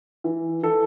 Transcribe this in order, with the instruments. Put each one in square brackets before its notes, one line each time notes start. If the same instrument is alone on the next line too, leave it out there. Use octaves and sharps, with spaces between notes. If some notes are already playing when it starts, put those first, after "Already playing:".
[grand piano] E3
E3 A4